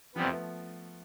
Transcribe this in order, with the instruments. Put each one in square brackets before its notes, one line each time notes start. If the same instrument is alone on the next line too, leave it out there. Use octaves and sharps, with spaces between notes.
[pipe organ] F2 C3 E3 G3 B3 [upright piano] F3
[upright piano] A3 B3